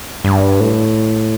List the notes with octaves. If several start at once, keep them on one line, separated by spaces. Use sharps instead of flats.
G2
A2